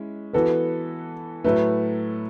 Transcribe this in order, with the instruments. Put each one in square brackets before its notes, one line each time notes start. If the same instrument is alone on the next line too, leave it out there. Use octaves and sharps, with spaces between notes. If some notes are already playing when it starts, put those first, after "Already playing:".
Already playing: [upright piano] G#3 C#4 E4
[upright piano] E3 B3 F#4 A4 [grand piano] B4
[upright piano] A2 F#3 A3 [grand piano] B4